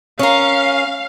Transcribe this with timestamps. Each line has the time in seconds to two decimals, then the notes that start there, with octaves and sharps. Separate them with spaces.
0.19 C#4 A#4 F5